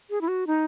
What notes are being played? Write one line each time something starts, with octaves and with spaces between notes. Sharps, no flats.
G#4
E4
F#4
D#4